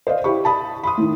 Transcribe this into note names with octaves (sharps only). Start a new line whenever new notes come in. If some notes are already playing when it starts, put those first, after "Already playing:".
C5 D5 D#5 F5
E4 G4 B5 C#6
A5 B5 D#6
B5 C6 D#6
A2 D#3